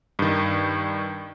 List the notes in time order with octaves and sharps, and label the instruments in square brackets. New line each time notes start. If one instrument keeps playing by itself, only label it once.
[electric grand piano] G2 D#3